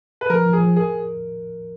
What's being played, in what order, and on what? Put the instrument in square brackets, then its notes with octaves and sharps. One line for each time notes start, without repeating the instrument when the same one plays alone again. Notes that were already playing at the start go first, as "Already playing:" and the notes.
[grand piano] B4
[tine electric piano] F3 [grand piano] A#4
[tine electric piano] F3
[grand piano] G#4
[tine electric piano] F3
[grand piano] G#4 [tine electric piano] A#4